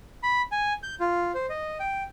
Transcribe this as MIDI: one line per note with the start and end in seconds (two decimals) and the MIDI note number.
0.23 0.42 83
0.52 0.73 80
0.83 0.95 91
1.00 1.32 65
1.34 1.46 72
1.49 1.78 75
1.80 2.03 79